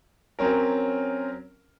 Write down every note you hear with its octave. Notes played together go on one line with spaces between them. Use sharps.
F#3 C4 C#4 A#4